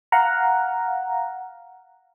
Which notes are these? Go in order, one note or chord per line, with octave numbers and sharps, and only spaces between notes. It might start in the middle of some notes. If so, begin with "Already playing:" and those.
F5 F#5 A#5